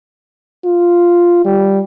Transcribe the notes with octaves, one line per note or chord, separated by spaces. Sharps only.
F4
G3